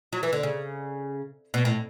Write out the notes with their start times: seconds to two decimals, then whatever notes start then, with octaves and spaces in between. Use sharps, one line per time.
0.13 F#3
0.23 E3
0.33 D3
0.43 C#3
1.54 B2
1.65 A2